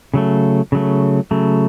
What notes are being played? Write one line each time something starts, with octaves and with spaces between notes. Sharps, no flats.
C#3 F#3 A3
C#3 F#3 A3
C#3 F#3 A3